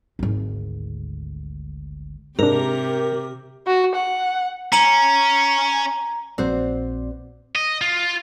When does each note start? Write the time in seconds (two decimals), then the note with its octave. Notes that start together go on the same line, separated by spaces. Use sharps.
0.19 G#1 D2
2.39 G#2 C3 D4 G4 A#4
3.67 F#4
3.95 F#5
4.73 C#4 A#5 D#7 F#7
6.38 A#1 C4 F#4 C5 D5
7.55 D#5
7.82 F4